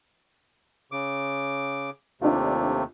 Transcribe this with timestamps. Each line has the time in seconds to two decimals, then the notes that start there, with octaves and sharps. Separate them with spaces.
0.92 C#3 D6
2.21 D#2 C3 A3 D4 F4